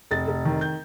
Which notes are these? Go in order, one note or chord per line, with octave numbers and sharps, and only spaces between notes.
F1 A6
F1
D#3
G6